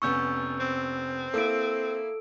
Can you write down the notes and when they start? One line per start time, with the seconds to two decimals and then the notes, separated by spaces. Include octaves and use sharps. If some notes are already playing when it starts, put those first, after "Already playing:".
0.02 F1 B3 C#4 C#6 E6 G6
0.60 C4
1.34 A#3 E4 A4 E6 D7